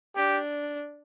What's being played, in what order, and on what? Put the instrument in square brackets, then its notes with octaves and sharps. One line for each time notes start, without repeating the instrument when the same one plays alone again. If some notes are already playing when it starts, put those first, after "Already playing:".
[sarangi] D4 [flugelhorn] G4